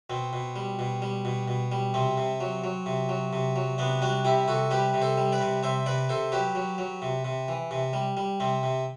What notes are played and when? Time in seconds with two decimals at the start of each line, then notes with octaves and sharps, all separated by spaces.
0.10 B2 C4
0.33 B2
0.56 G3
0.79 B2
1.02 G3
1.25 B2
1.48 B2
1.72 G3
1.94 C3 C4
2.17 C3
2.40 F#3
2.64 F#3
2.86 C3
3.09 F#3
3.33 C3
3.56 F#3
3.78 C3 B3 D4
4.02 G3 D4 F#4
4.25 C3 E4 G4
4.48 C3 F#4 A4
4.71 G3 G4 B4
4.94 C3
5.02 A4 C5
5.18 G3
5.32 B4 D5
5.41 C3
5.63 C3 C5 E5
5.86 C3 B4 D5
6.09 C3 A4 C5
6.32 F#3 G4 B4
6.55 F#3
6.78 F#3
7.02 C3
7.25 C3
7.48 E3
7.71 C3
7.93 G3
8.17 G3
8.40 C3 C4
8.63 C3